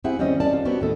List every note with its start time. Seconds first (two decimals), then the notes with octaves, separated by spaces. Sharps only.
0.04 C4 E4 G4 G#4 E5 F#5
0.19 D#2 G3 A#3 C4 C#4 D#5
0.40 C#4 A#4 D5 A5
0.53 F4
0.65 B3 C4 F#4 G4 A#4
0.80 D#2 A2 A4 D#5